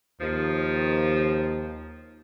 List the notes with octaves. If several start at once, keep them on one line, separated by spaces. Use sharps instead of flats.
D#2 D#3 F3